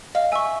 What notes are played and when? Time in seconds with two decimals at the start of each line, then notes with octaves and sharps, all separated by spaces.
0.15 D#5 F5
0.32 E5 G#5 C#6